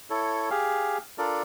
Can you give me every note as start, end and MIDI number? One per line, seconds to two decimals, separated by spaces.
0.10 0.50 64
0.10 0.50 69
0.10 0.50 73
0.50 0.98 67
0.50 0.98 68
0.50 0.98 77
1.18 1.43 62
1.18 1.43 65
1.18 1.43 69
1.18 1.43 70
1.18 1.43 74